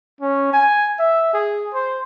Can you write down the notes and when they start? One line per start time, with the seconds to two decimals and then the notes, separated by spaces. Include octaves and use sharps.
0.21 C#4
0.53 G#5
0.99 E5
1.34 G#4
1.74 C5